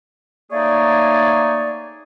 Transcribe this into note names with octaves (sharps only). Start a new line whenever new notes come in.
A3 A#3 D#4 G#4 C#5 D5